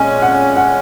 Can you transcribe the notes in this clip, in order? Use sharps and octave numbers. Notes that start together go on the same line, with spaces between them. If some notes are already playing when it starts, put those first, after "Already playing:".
Already playing: A#2 G#3 C#4 G#5
F#5
F#5